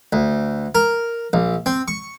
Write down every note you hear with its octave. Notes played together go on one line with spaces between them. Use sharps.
D2
A#4
A#1
C4
C#6